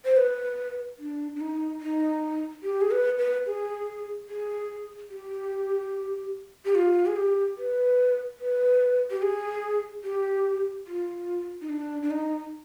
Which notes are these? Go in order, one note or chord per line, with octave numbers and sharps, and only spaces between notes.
C5
B4
D4
D4
D#4
D#4
G4
G#4
B4
B4
G#4
G#4
G4
G4
F4
G#4
G4
B4
B4
G4
G#4
G4
F4
D#4
D4
D4
D#4